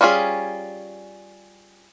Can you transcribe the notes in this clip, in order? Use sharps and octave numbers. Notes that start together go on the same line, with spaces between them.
G3 C#4 F4 G#4